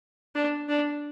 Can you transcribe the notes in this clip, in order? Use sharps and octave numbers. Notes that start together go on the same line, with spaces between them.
D4
D4